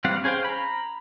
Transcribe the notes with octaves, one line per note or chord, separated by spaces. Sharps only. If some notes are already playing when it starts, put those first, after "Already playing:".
E3 G3 C4 F5 F#5
C#4 G#4 C5 F5 G5
A#5 B5